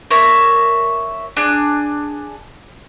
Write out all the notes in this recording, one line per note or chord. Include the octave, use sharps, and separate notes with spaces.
A#4 C#5 D5 E5
D4 G#4